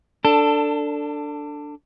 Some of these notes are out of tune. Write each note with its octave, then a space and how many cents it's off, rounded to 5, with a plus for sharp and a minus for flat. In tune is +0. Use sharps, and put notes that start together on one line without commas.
D4 +0 A4 +20